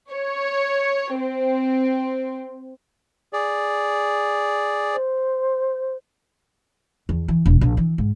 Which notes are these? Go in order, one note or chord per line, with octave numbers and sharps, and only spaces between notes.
C#5
C4
G#4 D5
C5
E2
E3
E1
A#1
E3
G#2